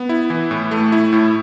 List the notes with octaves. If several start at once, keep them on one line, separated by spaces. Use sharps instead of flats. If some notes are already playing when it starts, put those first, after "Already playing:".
Already playing: B3
E4
E3
A2
A3
E4
A2